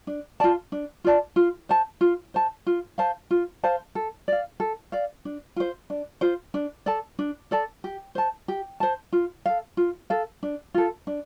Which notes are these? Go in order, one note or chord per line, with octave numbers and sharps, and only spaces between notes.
D4
F4 D5 A5
D4
F4 D5 A5
F4
C5 A5
F4
C5 A5
F4
C5 F5 A5
F4
C5 F5 A5
A4
D5 F5
A4
D5 F5
D4
F4 C5
D4
F4 C5
D4
A4 D5 A5
D4
A4 D5 A5
G4
C5 A5
G4
C5 A5
F4
A4 F5
F4
A4 F5
D4
F4 A4
D4